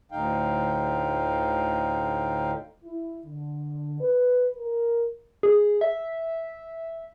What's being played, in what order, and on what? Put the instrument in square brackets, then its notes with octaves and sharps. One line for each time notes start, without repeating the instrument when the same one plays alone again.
[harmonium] D2 A2 D3 D#4 F5 G5
[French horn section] E4
D3
B4
A#4
[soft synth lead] G#4
E5